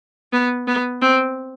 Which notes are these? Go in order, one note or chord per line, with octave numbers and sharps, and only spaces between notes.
B3
B3
C4